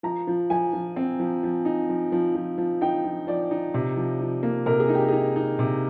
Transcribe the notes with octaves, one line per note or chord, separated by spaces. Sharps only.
F3 A#5
F3
F3 G#5
F3
C4
F3
F3
D#4
F3
F3
F3
F3
D#4 G5
F3
F3 D5
D#4
C3
F3
F3
A#3
C3 A#4
G#4
D#4
G4
D#4 G#4
D#4
C3